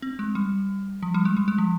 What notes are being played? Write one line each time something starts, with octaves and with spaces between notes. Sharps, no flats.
C4
G#3
G3
F3
G3
G#3
G3
G#3
F3